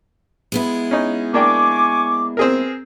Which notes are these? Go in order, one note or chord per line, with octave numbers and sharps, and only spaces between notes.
G#3 B3 E4
C#4 D#4
A#3 D4 G5 G#5 C#6 D6
C4 G#4 A#4